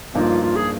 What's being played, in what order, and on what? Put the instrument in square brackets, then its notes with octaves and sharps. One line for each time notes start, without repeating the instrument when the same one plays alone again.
[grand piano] G1 G2 F3 A#3 D#4 [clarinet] F4
[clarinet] F4
G#4